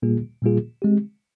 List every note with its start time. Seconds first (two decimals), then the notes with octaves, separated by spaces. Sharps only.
0.02 A#2 G3 A#3 F4 G#4
0.42 A#2 G3 A#3 F4 G#4
0.82 G#3 C4 G4